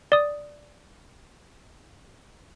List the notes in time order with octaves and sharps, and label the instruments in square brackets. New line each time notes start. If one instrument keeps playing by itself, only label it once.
[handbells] D5 D#6